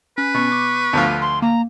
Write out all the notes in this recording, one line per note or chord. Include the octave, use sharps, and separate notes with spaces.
C#4 B4
B2 C#6
D6
D2 F3 F4
C6
A#3 A#5